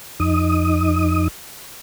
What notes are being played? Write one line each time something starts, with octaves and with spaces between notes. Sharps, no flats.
F2 D#4 D#6